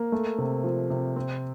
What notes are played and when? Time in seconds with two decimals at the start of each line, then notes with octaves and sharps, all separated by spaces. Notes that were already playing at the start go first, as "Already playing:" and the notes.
Already playing: A#3
0.12 A3
0.38 C3
0.64 F3
0.90 C3
1.16 C4